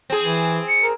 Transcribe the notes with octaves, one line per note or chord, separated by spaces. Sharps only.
C4 G#4
E3
C#7
A#4